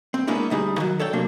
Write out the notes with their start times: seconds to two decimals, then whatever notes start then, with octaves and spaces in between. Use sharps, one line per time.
0.14 C4
0.27 G#3 A#3 B3 C#4 D4 E4
0.50 D2 G3 D#4 G#4
0.78 D#3 F#3
0.99 A4 C#5 D5 G5
1.13 C3 F#3 A#3 D4